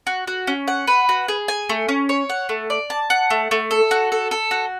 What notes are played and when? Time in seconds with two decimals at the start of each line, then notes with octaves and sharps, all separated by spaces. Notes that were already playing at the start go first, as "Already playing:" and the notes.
0.07 F#4
0.27 F#4
0.47 C#4
0.68 F#5
0.87 B4
1.09 F#4
1.28 G#4
1.48 G#5
1.69 A3
1.88 C#4
2.09 C#5
2.29 F#5
2.49 A3
2.70 D5
2.90 A5
3.10 F#5
3.30 A3
3.51 A3
3.71 A4
3.91 F#4
4.12 A4
4.31 A4
4.51 F#4